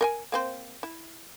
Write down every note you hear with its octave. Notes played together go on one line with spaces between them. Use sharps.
A#4 G5 G#5
A#3 C4 C5
E4